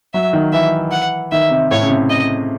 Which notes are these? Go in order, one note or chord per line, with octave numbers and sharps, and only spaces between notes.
F#3 E5
D#3
E3 E5
F#5
D#3 E5
C3
A2 C#5
C#3
C3
D#5